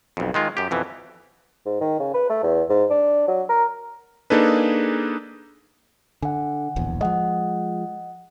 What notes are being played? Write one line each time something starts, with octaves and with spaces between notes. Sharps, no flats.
B1 F2
D#3 G#3 F4
F#2 G4
F2 B2 E3
G#2
D#3
C#3
B4
A3
E2
G#2
D4
F#3
A#4
A#3 D4 D#4 G#4 A4 B4
D3 F#5 G#5
D1 A#1 E2
F3 G#3 D#5 F#5